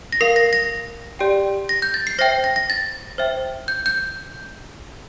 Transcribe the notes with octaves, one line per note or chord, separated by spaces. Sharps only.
A#6
A#4 F5 C7
A#6
A#6
G4 D5 G5
A#6
G6
A6
C7
C5 E5 G5 A#6
A#6
A#6
A6
C5 E5 G5
G6
G6